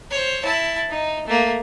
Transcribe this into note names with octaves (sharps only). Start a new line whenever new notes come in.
C5 C#5
E4 A5
D#4
A3 A#3